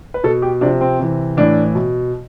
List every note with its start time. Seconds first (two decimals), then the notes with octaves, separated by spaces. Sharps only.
0.14 B4
0.24 B2 A4
0.42 G4
0.61 C3 F3 D4
0.81 C4
0.99 C3 E3
1.37 A2 E3 D4
1.75 B2